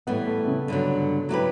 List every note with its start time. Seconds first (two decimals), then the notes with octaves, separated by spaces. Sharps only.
0.07 A2 E3 G3 B3
0.27 A3
0.47 C#3
0.68 G2 D3 F#3
1.29 F#3 B3 E4 G4 B4